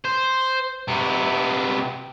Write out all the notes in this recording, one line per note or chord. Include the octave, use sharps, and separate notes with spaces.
C5
C3 B3